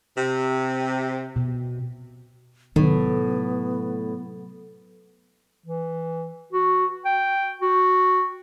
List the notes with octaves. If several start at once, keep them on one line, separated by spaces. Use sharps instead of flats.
C3
B2
A2 C3 D#3 F#3 B3
E3
F#4
G5
F#4